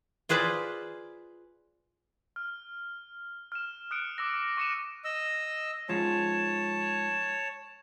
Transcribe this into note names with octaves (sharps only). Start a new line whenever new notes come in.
F4 G#4 B4 C5 D5
F6
F6 E7
D#6 F#6 C#7 D7
D6 E6 A#6
C#6 A#6 C#7 D#7 E7
D#5 E6
G#2 F3 C#5 A5